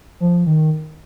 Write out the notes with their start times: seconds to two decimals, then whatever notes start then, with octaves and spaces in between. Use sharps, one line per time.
0.20 F3
0.47 D#3